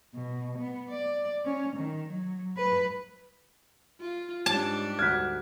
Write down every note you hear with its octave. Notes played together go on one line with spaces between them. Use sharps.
B2
B3
D5
C#4
D#3
F#3
B4
F4
G#2 G3 D4 A5
D2 F6 F#6 G#6 B6